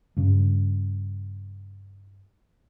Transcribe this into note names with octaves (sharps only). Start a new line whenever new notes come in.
G2 C#3